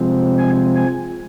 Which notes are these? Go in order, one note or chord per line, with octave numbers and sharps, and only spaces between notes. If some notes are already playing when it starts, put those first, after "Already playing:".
Already playing: C3 F3 G#3 C4
G#5
G#5